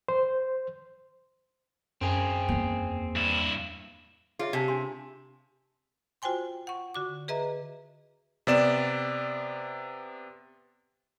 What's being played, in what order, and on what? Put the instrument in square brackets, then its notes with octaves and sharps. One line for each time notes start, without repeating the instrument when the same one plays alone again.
[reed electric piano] C5
[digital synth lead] F#2 [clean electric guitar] C4 G#4
[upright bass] E2 A#3
[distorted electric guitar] G2 E4
[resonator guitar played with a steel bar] F4 [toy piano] G#4 C#5 E5
[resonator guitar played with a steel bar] C3 [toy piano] G4 G#5 A5
[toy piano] D4 G#5 C6
[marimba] F4 F#4 C5 G5 G#5 C6
F#5 C#6
D3 F#4 D6
G#4 B4 D#5 E5 A#5
[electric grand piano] C3 B3 D5 E7